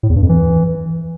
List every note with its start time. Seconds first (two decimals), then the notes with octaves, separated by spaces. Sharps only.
0.03 A2
0.10 E2
0.16 G2
0.23 F2
0.29 E3